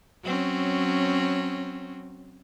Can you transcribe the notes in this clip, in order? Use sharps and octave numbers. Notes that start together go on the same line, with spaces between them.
F#3 C4 C#4